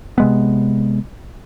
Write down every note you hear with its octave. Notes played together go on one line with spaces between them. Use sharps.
C3 G#3 B3